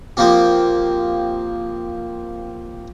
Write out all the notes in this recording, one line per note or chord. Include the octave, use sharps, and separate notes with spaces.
F3 A#3 C4 G4